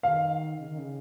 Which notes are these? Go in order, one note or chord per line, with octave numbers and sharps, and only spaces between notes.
D#3 F5
C#3
D#3
C#3